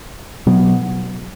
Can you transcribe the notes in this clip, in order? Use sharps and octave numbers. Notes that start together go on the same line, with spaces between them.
B2 F#3 B3